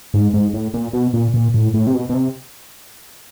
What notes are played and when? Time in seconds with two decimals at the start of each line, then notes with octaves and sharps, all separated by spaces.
0.14 G#2
0.34 G#2
0.54 A2
0.74 A#2
0.93 B2
1.14 A#2
1.34 A#2
1.54 A2
1.74 A2
1.87 C3
1.94 B2
2.09 B2
2.14 C3